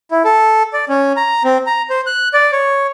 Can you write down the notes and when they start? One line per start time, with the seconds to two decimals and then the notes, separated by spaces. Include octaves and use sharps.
0.11 E4
0.25 A4
0.73 D5
0.89 C#4
1.17 A#5
1.44 C4
1.67 A#5
1.90 C5
2.07 F#6
2.34 D5
2.52 C#5